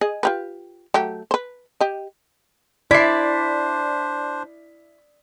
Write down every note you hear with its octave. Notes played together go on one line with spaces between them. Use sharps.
G#4 D#5
F4 G4 B4
F#3 A3 G4
B4 C5
G4 D#5
D4 E4 C5 D5 E5 B6 C7